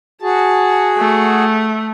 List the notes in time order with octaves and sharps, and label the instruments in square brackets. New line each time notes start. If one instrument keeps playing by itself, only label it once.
[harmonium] F#4 G#4 [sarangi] A5
[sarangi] A3